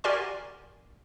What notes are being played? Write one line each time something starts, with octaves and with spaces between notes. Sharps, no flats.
F#4 G4 A#4 D5 G#5 C6